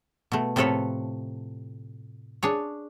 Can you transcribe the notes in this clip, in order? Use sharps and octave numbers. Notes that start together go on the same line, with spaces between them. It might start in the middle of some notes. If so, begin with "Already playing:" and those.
B2 A3
A2 C3 F3 A4 B4 C#5
D4 G#4 C#5